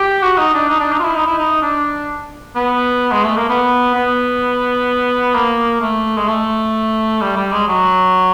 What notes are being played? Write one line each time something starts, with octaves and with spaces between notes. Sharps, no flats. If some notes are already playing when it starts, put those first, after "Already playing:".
Already playing: G4
F#4
D#4
D4
D#4
D4
D#4
F4
E4
D#4
E4
D#4
D4
B3
G#3
A3
A#3
B3
B3
A#3
A3
G#3
A3
G3
G3
G#3
F#3